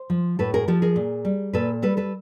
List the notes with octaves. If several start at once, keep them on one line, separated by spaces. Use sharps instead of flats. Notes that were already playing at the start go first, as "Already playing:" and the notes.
Already playing: C5
F3
A2 A4 B4
G#4 A#4
F3 G4 A4
G#4 A#4
A#2
G3
A#2 A4 B4
G3 A4 B4
A4 B4